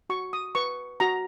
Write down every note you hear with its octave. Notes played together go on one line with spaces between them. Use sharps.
F#4 C#6
D#6
B4 C#6
F#4 A#5